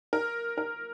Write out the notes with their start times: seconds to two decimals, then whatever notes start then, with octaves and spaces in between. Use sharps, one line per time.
0.13 A#4
0.58 A#4